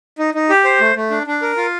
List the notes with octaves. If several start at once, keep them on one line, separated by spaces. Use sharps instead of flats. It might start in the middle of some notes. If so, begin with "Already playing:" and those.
D#4
D#4
G4
C5
A3
A3
D4
D4
A#4
F4